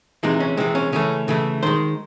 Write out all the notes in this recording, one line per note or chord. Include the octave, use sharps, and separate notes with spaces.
C3 E3 G#3 D#4
C#4
C3 E3 G#3 C4
C#4
C#3 E3 A3 C#4
C#3 E3 A3
D#3 G#3 C5